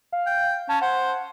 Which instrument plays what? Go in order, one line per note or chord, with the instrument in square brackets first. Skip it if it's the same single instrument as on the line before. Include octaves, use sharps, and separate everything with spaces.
[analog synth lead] F5
[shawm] G5
[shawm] C#4 [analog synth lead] A5
[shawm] C5 [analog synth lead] F#5